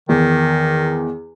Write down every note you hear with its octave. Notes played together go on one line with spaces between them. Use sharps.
E2 D#3